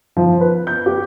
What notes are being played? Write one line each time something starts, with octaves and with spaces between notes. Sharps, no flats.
F3
B4
G6
G4